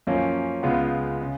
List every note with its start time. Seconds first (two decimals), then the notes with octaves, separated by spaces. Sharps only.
0.07 F#2 F3 A#3 C#4
0.63 C#2 C#3 G#3 B3 F4
1.22 C#3